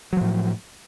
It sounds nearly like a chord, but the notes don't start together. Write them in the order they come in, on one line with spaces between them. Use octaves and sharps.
F#3 F3 A2